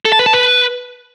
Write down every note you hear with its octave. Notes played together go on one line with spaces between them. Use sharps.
A4
A5
B4
A5
B4